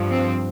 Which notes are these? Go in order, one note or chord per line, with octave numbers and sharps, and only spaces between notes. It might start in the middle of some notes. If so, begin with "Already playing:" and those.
Already playing: G2 F3
C4